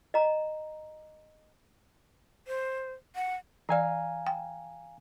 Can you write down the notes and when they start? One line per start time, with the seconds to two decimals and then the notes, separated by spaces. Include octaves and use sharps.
0.14 D#5 A#5
2.48 C5
3.16 F#5
3.69 E3 D5 F5 G#5 A#5
4.27 G5